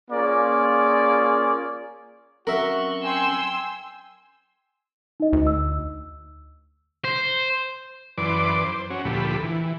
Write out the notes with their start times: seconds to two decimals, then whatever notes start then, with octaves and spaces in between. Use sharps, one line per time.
0.11 A#3 C#4 F4 G#4 D5
2.47 F#3 C4 C#4 F#4 A#4 E5
3.05 G5 G#5 C6 E6
5.20 D#4 D#5
5.33 D2
5.47 E6
7.04 C5
8.18 F#2 E3 B4 D5 C6 D6
8.64 C5
8.90 C#4 F#4
9.05 D2 A#2 F3 G4 A4 B5
9.43 E3